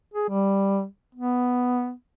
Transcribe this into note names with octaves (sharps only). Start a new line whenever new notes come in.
G#4
G3
B3